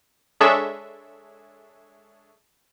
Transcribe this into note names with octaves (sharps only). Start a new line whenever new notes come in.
G#3 D4 G#4 A4 C#5 E5